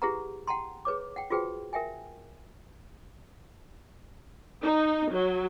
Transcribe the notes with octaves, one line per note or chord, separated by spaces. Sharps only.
E4 G4 G#4 B4 F#5 A#5
F#5 G5 A5 A#5 C6
G#4 B4 C#5 D6
F#5 G5
F4 F#4 G#4 B4 C5 G5
A#4 E5 G5 G#5
D#4
F#3